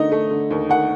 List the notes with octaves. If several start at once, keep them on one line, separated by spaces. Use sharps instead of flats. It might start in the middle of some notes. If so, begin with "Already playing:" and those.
Already playing: D3 A3 D#4 D#5
A3
D3
D#2
D#2 F#5